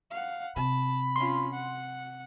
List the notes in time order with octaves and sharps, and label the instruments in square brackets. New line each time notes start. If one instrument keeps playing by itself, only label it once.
[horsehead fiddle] F5 F#5
[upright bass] C3 [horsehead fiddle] A5 [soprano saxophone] B5
[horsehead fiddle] C#4 F4 [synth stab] C6
[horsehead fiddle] F#5